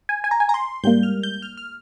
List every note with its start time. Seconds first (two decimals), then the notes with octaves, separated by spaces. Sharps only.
0.09 G#5
0.24 G#5
0.31 A#5
0.40 G#5
0.49 A#5
0.54 C6
0.84 G#2 G3 A#3 G6
1.03 F6
1.23 G6
1.42 F6
1.57 F6